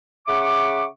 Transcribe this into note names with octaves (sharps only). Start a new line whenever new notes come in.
C#3 E5 F#5 C#6 D6